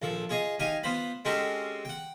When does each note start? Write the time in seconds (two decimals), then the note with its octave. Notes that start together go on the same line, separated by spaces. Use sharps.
0.02 A#1 F3 A4
0.29 F4 G#4 C#5 D#5
0.60 D#4 G4 F5 G#5
0.83 B3 F4 C5 B5
1.25 G#3 C4 C#4 F#4 G4 A4
1.85 F#5 G5